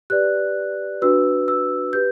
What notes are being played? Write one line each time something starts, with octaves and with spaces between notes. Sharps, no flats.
G4 B4 D5 F#6
D4 F#4 B4 E6
E6
G4 B4 G6